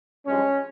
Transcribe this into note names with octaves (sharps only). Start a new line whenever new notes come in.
G2 F3 G#3 C#4